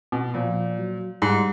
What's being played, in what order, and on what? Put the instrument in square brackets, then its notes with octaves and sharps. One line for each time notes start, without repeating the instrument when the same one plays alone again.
[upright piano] B2
[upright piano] A#2 [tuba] F3
[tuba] F#3
[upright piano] G#2 [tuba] G3